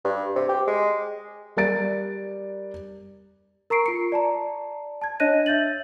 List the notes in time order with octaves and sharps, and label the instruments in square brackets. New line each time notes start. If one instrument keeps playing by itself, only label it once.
[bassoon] G2
C3
G4
G#3
[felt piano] G3 A#4 D5 A6 D7
[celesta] A#4 A#5 C#6 C7 D7
F4 C#7
D5 A5 A#5
A5 G#6
D4 C#5 D#5 F#6 A#6 D#7
E5 G6 A6 F#7